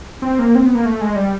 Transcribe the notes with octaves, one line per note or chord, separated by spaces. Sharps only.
C4
A#3
C4
B3
A#3
A3
G#3
G3